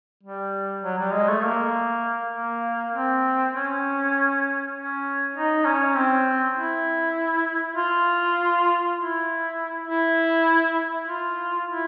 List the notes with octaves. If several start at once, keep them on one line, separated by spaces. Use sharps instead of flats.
G3
F#3
G3
G#3
A3
A#3
A#3
C4
C#4
C#4
D#4
C#4
C4
E4
F4
E4
E4
F4
E4